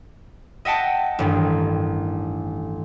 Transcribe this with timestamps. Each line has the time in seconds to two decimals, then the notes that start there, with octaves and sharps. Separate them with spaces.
0.65 D#5 E5 F#5 G5 A5
1.19 A1 G2 D#3